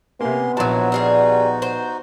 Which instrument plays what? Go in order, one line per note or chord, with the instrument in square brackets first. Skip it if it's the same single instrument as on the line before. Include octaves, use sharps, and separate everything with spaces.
[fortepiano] C3 A#3 [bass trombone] B3 [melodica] C#4 C6
[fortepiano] A#1 A5 [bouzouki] F3 F#3 [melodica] D#4 F#4
[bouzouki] G3 F4 G#4
C5